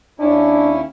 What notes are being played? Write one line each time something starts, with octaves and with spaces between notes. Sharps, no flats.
D#2 C#4 D4 E4